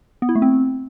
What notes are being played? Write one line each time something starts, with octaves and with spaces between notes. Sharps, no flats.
B3
E4
A3
C4